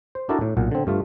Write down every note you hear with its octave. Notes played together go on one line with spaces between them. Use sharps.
C5
D4 E4 F#4 A4 A#4 D5
A2
B1 A#2 F#5
D3 C4
G2 A3 F4